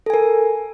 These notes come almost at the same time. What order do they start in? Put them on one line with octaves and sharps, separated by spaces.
A4 G#5 A#4